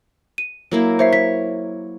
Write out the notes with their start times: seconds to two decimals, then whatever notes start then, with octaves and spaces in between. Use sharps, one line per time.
0.38 D#7
0.71 F#3 A#3 E4
0.99 C5 C#5 E5 C7
1.13 C#5 B6